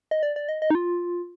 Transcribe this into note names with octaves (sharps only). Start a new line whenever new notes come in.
D#5
D5
D5
D#5
D#5
D#4
F4